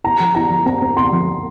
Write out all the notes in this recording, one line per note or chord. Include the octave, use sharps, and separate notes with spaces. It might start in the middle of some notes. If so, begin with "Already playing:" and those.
E4 A#5
F3
E4 A#5
F3
C4 A#5
C4
E4 C6
F3
A#2